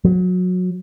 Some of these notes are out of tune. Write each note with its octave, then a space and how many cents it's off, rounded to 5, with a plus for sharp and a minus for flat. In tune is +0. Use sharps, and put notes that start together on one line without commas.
F#3 -25